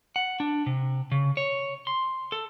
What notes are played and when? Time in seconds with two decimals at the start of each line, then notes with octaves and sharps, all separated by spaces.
0.16 F#5
0.40 D4
0.66 C3
1.12 C#3
1.37 C#5
1.87 C6
2.32 A4